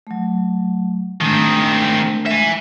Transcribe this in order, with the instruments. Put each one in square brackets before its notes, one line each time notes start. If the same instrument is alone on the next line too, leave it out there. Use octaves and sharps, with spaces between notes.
[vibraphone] F#3 A3
[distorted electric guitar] D#3 C4 [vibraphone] G#3 A3 D4
[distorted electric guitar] E5 G#5